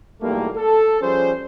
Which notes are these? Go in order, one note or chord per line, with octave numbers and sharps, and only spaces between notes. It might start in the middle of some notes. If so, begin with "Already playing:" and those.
B1 E2 G3 A3 A#3
A4
F3 G3 C#4 G#4 C5